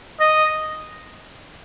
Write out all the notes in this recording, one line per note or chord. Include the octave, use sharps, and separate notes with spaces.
D#5